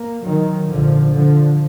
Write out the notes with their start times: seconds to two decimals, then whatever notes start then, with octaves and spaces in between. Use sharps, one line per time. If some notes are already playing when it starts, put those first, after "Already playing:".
Already playing: A#3
0.24 D#3 F#3
0.69 A#1 G#2 D3 F3
1.14 D3 F3